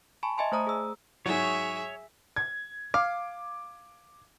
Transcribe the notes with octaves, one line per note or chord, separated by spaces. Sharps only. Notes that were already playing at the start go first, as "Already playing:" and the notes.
G#5 A5 B5 C#6
D#5 E5 G#5 A5 C6
A3 C5 A#5 D#6
G#4 E6
G#2 F#3 G#4 C#5 E5
G#6
F5 D6